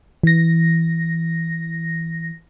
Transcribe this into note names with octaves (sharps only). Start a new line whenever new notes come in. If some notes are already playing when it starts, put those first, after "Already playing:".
E3 A#6